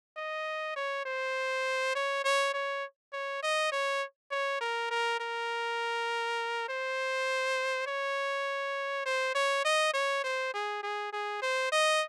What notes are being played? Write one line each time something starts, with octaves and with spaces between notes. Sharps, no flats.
D#5
C#5
C5
C#5
C#5
C#5
C#5
D#5
C#5
C#5
A#4
A#4
A#4
C5
C#5
C5
C#5
D#5
C#5
C5
G#4
G#4
G#4
C5
D#5